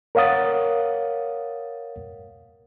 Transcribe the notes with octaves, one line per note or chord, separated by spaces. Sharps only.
A#4 C#5 F5 F#5 D#6 A6